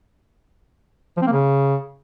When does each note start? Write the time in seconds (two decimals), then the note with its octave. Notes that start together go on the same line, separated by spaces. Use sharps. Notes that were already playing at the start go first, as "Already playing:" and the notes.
1.17 F3
1.22 C4
1.27 A#3
1.32 C#3